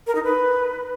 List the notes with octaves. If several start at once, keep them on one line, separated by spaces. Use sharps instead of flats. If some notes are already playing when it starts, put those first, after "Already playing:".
A#4
D#4
B4